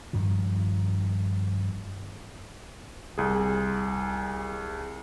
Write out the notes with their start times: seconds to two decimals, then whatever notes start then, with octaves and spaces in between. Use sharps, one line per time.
0.13 G2 D#3 F3
3.18 C2 G#4